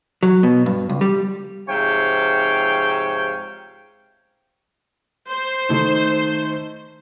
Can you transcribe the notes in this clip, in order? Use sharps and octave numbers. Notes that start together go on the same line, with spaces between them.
F#3
B2
G2
C#2
G3
G#2 C3 F3 C#5 F5 G5
C5
D#3 A3 D#4